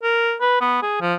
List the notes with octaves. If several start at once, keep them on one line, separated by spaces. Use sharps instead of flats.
A#4
B4
B3
G#4
F3